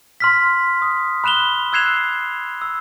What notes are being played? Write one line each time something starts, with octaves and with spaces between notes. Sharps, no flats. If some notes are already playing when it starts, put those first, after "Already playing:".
C6 F6 B6
D#6
B5 F#6 E7 F7 G7
E6 F#6 G#6 C7 E7 F7
E6